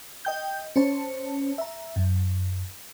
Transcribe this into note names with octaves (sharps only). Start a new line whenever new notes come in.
D#5 G5 G6
C#4 C5 C#5 A5
E5 A#5
F#2